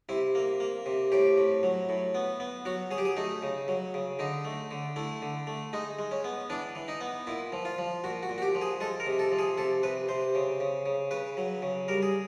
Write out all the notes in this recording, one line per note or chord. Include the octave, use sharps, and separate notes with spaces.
C3 E4
A#3
A#3
C3
A2 G4
A2
F#3
A2
B3
B3
F#3 F#4
F#3 G#4
G4
G#4
A3 D#4
C#3
F#3
C#3
D3 D#4
A3
D3
A3 E4
D3
A3
G#3 D#4
G#3
C#4
B3
E3 D4
E3
D#4
B3
A#2 E4
F3
F4
F3
A#2 F#4
F#4
A#2
F#4
G4
F3
G#4
G#3 A4
A#4
C3
A4
F3
G#4
C3 A4
C3 B4
C3 C5
C#3
C#3
C#3
C#3 B4
F#3
C#3
G3 A#4
G#4